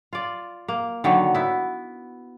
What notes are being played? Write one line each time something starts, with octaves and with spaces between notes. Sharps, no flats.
F4 D5
A#3
D3 D#3 F#3 F#4
B3 E4